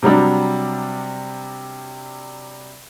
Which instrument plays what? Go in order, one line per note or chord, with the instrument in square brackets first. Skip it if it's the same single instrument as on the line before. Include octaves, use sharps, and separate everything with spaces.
[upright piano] C3 F#3 G3 D4